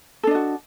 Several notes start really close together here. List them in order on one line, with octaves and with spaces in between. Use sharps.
A4 D4 D#5 F#4